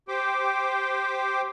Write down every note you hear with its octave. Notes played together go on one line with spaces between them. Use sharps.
G4 C5 G5 D6